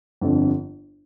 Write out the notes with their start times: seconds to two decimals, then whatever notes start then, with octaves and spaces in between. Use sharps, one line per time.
0.21 G1 F2 D3